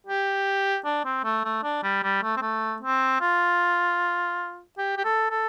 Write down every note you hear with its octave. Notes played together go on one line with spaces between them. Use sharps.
G4
D4
C4
A3
A3
D4
G3
G3
A3
C4
A3
C4
F4
G4
G4
A4
A4